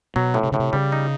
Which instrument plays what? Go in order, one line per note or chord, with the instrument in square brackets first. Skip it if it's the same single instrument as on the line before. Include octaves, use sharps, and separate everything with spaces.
[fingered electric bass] B2 [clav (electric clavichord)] F#3
[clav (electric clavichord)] A2
[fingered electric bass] C3
[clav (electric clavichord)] A2 [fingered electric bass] C#3
[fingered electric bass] C3
[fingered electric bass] C#3 [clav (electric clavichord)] G3
[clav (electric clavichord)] D#4